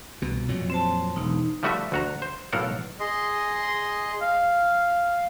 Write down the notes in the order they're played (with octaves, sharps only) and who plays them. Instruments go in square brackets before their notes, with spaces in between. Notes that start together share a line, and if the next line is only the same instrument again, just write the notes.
[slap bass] C2 B2
F2 A#2 F#3
[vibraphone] C4 C5 A5
[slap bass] E1 [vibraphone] D#4
[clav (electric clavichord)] F3 G3 A3 F#4 B4 E5
D2 F#4 A#5
C5
B1 A2 A4 A#4 F5 F#5
[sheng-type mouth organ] G#4 D#5 C6
F5